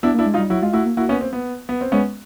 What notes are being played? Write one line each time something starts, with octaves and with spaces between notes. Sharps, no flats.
B3 D4 E4
A#3
D4 E4
G#3
D#4 F4
G3
F#3 E4 F#4
G#3 F4
A3 E4 F#4
A#3
A#3 E4 F#4
B3 C#4
C4
B3
B3
C4
G#3 B3 C#4